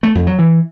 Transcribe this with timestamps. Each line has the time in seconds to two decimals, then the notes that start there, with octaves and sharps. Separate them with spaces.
0.03 A3
0.15 F2
0.27 F#3
0.39 E3